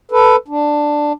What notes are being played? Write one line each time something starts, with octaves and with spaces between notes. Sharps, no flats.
A4 B4
D4